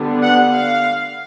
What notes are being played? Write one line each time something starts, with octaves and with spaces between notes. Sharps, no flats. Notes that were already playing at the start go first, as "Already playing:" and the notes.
Already playing: D3 G3 B3 D4
F#5
F5